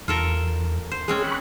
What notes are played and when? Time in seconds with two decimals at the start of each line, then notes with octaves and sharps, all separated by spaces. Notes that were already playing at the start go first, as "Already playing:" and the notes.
0.08 E2 F4 A4 A#4
0.91 C5
1.08 G#3 C4 C#4 G#4
1.23 B5 C#6 F#6